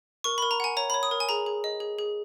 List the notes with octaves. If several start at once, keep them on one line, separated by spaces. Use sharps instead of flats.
A#4 C#6
B5
A#4
A#5
F#5 G#5
C#5 A#5
B5
C#5
D#6
A#4
G#5
G#4 A#5
G#4
D#5
G#4
G#4